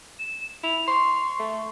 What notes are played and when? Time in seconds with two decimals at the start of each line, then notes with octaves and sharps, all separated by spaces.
0.19 E7
0.63 E4 F7
0.88 C6 C#6
1.39 A3